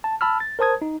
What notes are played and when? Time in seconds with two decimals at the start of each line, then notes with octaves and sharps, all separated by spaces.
0.04 A5
0.21 A5 B5 E6 F6
0.40 A6
0.59 A#4 C5 A5 D#6 G#6
0.82 D#4